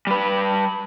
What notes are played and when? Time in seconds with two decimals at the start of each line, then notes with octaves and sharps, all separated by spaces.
0.07 G3 B4